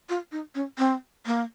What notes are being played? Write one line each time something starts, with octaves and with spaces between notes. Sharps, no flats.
F4
D#4
C#4
C4
A#3